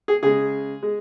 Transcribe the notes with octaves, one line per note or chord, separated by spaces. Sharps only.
G#4
C#3 G#3 G#4
G#3